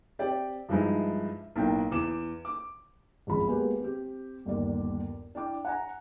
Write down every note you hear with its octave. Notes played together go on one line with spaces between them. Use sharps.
C4 G4 D5 G5
G2 F3 G#3 D#4 E4
B1 A2 A#3 G5
E2 D6 E7
D6
G#1 C#2 F3 B5
G#3 A#3 B3 F#4 G4 B4
C4 G4
G1 D#2 D5
D4 E4 G5 D6
F#5 G#5 A#5